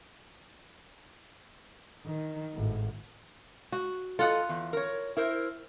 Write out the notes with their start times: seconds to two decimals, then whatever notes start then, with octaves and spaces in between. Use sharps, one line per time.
2.06 D#3
2.55 G#1 A2
3.72 F#4
4.19 F4 A4 D#5 F#5
4.49 E2
4.73 A#4 C#5
5.17 E4 A#4 C5